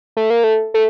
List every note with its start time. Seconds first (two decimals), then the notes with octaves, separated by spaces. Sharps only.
0.17 A3
0.30 A#3
0.44 A3
0.74 A3